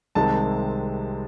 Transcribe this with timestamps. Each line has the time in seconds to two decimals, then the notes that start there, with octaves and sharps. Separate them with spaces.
0.15 C2 C3 D#3 G#3 C4 A5